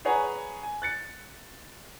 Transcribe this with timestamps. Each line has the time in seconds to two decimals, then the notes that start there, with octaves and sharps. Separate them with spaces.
0.05 G#4 B4 C#5 F#5 G#5 A#5
0.63 G#5
0.82 F#6 A6 C#7